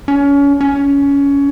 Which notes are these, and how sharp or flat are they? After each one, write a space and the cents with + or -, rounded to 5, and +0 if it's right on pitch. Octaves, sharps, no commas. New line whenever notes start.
C#4 +30
C#4 +20